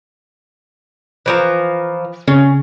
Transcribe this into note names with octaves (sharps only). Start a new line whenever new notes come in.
E3 F3 A#5
C#3 C#4